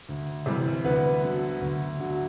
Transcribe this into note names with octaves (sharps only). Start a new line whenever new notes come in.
D2
C3 E3 G3
D2 B3 B4
D3 F#3
D2
D3 F#3